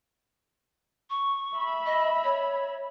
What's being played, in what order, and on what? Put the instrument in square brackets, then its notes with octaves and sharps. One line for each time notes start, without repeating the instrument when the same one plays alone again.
[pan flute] C#6
[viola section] E5 B5
[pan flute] D#5
C#5